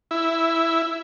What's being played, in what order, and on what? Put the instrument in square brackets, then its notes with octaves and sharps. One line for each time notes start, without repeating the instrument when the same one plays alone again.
[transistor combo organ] E4